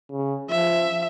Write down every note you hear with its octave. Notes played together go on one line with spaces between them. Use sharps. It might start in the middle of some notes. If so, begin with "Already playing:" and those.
C#3
F3 E5